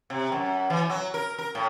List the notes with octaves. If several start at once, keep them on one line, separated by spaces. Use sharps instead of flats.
C3
F#2
E3
F#3
A#4
A#4
A2